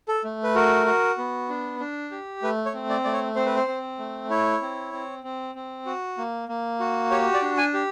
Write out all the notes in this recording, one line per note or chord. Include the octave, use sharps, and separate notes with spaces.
A4
A3
B4
F#4 A#4
F#4
B3
D4
D4
G4
A3 B4
C#5
C4
D5
A3 D5
C#5
C4 C5
B4
C5
C4
A3
E4 C#5
C4
C4
C4
C4
F#4
A#3
A#3
F#4
G4 C#5
D5
D4
G#5
G4